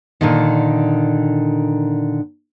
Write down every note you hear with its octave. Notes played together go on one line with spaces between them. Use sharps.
A#2 D3 D#3